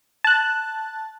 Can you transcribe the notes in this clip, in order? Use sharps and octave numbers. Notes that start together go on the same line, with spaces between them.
A5 F#6